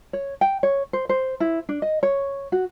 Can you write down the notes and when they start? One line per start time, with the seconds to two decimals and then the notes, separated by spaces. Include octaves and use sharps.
0.13 C#5
0.41 G5
0.63 C#5
0.93 C5
1.09 C5
1.40 E4
1.69 D4
1.82 D#5
2.03 C#5
2.52 F#4